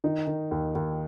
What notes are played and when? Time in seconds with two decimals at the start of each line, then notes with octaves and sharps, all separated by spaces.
0.04 D#3 D#4
0.27 D#3
0.51 D#2
0.75 D#2